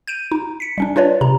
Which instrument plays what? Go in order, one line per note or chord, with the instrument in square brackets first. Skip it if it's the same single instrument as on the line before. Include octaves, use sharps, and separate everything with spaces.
[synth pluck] G6 D7 D#7
D#4
B6 C#7
G3 C#4 D4
D4 F4 B4 C#5 D5
C3 A#5